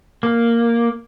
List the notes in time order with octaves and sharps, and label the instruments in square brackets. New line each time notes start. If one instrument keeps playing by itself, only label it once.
[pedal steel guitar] A#3